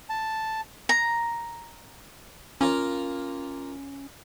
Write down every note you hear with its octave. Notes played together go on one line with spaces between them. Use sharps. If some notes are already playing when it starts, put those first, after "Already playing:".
A5
A#5
A#3 C#4 F4 A#4